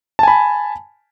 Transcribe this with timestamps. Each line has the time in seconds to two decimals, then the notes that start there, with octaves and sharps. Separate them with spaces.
0.19 A5
0.23 G#5
0.28 B5